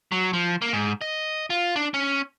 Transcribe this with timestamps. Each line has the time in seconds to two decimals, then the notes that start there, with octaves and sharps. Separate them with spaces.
0.12 F#3
0.33 F3
0.62 A#3
0.73 G#2
1.01 D#5
1.50 F4
1.76 D4
1.94 C#4